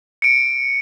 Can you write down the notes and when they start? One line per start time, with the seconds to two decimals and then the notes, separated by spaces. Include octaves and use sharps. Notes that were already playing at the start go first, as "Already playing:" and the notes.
0.22 C#7 D7